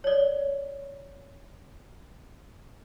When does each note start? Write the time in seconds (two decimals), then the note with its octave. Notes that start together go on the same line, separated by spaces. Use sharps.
0.04 C#5 D5